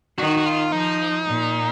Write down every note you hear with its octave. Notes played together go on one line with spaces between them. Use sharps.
D#3 F#4
F#4
F4
F3 D#4
A#2